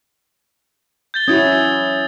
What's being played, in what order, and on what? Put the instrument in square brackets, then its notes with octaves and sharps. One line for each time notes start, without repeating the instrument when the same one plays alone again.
[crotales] G6 A6 G7
[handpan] C#4 E4 F#4 [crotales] D#6 G#6